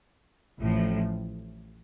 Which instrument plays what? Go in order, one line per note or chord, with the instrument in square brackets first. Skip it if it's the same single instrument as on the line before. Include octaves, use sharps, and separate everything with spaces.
[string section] A1 A2 F3